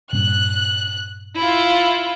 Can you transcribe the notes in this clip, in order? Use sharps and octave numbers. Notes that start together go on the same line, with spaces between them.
G2 A#2 C#4 F#6
E4 F4